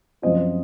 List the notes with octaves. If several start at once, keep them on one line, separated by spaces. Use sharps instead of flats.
F#2 F3 C4 F4 D#5